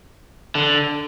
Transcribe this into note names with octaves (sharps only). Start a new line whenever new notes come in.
D3